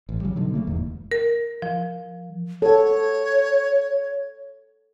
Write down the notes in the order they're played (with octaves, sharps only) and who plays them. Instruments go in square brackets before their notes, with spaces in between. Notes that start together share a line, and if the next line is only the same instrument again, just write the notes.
[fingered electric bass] A1
C#3 F#3 G3
B2 D3 D#3 F#3
C#3 A3 A#3
D#1 E2 G#2
[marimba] A#4
F3
[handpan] A4 F#5 [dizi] C#5